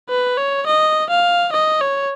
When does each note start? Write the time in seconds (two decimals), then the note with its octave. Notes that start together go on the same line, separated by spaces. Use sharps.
0.09 B4
0.38 C#5
0.67 D#5
1.10 F5
1.53 D#5
1.81 C#5